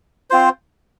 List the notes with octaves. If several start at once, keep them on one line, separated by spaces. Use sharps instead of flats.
C4 F4 C5